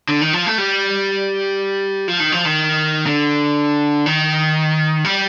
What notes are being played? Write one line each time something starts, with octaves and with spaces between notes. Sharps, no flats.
D3
D#3
F3
A3
G3
F3
D#3
F3
D#3
D3
D#3
G3